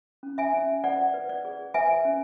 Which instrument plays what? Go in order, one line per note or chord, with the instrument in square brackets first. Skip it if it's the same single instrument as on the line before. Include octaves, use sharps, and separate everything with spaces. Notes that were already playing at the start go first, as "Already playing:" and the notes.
[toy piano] C#4
E5 G#5
C#4
B4 D5 F#5
B4
D5
G#4
B4 E5 G#5
C#4